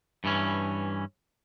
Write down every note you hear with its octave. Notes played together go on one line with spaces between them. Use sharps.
G2 E3 C#4